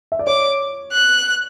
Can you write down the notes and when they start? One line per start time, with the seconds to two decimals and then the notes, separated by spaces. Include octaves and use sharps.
0.12 E5
0.19 D5
0.27 C#5 D6
0.92 F#6